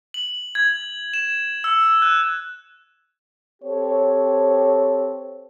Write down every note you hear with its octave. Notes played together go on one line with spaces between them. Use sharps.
F#7
G#6
E7
E6
F#6
C4 G4 A4 C5 C#5